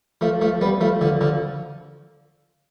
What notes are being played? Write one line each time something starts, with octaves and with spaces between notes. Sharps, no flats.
F3 A3
F3 A3
G3 B3
F3 A3
D3 F3
D3 F3